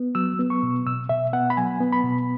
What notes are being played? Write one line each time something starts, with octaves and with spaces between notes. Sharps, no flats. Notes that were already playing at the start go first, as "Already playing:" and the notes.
Already playing: B3
F#3 E6
B3
C#6
B2
B2 E6
B2 E5
B3 F#5
B5
F#3 G#5
B3
B5
B2